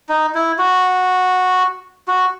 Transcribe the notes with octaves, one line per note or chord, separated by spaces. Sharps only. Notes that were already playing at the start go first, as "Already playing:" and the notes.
D#4
E4
F#4
F#4